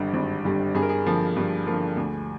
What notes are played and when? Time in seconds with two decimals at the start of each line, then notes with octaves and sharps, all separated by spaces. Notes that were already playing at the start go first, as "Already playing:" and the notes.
Already playing: G#1 G2 D3 G3
0.13 G#1
0.45 G2 D3 G3
0.75 G2 G#4
0.82 A#4
0.89 G#4
1.05 D3 F3 A#3
1.36 G2
1.66 D3 F3 A#3
1.97 D2